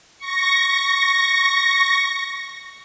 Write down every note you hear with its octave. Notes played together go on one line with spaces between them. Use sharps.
C#6 A#6